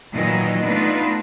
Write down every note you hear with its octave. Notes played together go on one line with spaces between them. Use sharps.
A#2 D#3 E3 F#3 D#5
A3 B3 D4 D#4 F4 B4